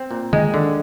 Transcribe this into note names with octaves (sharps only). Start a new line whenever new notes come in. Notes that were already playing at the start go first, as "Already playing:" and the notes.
Already playing: C4
A#2
D#3 G#3
D3